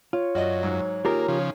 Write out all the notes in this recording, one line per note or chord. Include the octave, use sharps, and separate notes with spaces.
F4 C#5
F#2 F#4 D5 D#5
G#2 F#3
D#3 A#3 F4 G4 G#4 A#4
C#3 F3